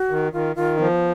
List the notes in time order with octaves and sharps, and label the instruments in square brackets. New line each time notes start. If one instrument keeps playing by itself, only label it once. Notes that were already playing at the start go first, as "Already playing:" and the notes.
Already playing: [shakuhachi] F#4
[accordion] D#3
[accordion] D#3 [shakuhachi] F4
[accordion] D#3 [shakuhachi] F4
[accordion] F3 [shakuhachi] B3